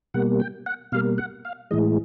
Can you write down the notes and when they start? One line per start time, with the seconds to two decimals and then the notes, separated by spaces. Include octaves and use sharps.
0.14 B2 G3 A#3 F#5
0.40 G5
0.66 F#5
0.92 B2 G3 A#3 F5
1.18 F#5
1.45 F5
1.71 A2 E3 G#3 D#5